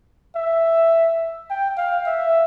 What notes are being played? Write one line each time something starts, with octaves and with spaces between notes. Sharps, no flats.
E5
G5
F5
E5